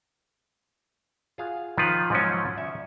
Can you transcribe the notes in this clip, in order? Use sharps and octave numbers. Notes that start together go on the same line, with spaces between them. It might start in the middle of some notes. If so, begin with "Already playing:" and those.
F4 F#4 G#4 F5
D#3 F3 F4 B4
G#2 F3 F#3 C#4
D5 E5